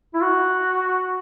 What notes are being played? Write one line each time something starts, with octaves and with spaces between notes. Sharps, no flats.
E4
F#4